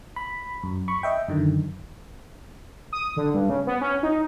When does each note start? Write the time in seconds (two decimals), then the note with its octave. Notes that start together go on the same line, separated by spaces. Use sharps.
0.16 B5
0.63 F#2
0.88 B5 C#6
1.03 D#5 E5 G5
1.28 F#2 D3 D#3
2.93 D#6
3.16 D3
3.34 G2
3.50 C#3
3.67 B3
3.81 C#4
4.03 D#4